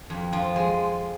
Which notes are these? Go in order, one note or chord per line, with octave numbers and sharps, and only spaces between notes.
F2
F3
G#3